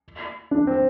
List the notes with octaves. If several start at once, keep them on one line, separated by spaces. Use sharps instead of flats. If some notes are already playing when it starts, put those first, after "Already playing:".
D4
C4